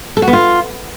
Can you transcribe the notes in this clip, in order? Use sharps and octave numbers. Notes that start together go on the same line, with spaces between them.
A4
F#4
B3
F4